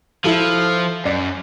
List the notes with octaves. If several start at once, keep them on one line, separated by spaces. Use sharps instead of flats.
F3 E4 A4 F#7
F#2 D5